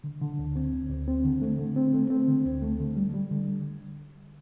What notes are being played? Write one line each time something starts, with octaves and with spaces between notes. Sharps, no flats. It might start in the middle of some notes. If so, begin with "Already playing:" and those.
D3
D3
D2
C4
D2
D2
C4
D3
A3
D3
C4
A3
C4
D3
D2
A3
D3
G3
G3
D3